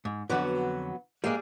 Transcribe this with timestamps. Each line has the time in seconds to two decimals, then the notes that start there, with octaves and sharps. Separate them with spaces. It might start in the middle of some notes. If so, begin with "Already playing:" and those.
0.05 G#2
0.30 F2 D3 F#3 B3 F#4
1.24 G3 G#3 A#3 G#4